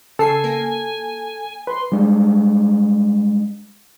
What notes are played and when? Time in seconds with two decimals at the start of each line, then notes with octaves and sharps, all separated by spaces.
0.19 C#3 A4 G#5 E6 C7
0.44 A#3
1.67 B4 C6
1.92 G3 G#3 D4